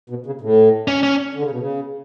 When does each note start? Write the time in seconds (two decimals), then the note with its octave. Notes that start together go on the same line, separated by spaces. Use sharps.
0.10 B2
0.26 C#3
0.41 A2
0.88 C#4
1.03 C#4
1.35 D3
1.42 C#3
1.51 B2
1.59 C#3